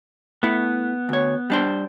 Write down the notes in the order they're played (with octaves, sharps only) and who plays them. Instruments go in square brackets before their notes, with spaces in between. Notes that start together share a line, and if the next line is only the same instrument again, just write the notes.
[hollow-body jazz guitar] A3 E4 [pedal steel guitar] B3
[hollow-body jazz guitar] D2 C#5
G3 D4 C5